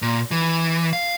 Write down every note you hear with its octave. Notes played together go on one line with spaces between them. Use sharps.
A#2
E3
F5